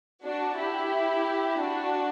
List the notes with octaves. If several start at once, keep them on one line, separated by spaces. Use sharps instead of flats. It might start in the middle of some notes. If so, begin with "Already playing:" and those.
D4 F#4
E4 G4
D4 F#4